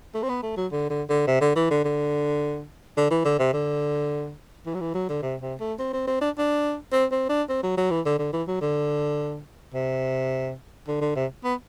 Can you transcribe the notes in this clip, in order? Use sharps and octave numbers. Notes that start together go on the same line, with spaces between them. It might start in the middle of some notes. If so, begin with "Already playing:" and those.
A3
C4
B3
A3
F#3
D3
D3
D3
C3
D3
E3
D3
D3
D3
E3
D3
C3
D3
E3
F#3
E3
F#3
D3
C3
C3
A3
C4
C4
C4
D4
D4
C4
C4
D4
C4
F#3
F#3
E3
D3
D3
E3
F#3
D3
C3
D3
D3
C3
B3